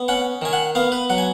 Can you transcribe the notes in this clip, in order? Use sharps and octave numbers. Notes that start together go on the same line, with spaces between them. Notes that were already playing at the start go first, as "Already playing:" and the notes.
Already playing: B3
C#4 F#5
D#3 G#5
F#5
B3 F5
B4
F#3 F#5
G#5